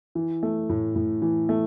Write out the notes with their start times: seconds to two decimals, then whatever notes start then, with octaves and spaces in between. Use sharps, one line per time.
0.15 E3
0.43 A3
0.69 A2
0.96 A2
1.22 E3
1.49 A3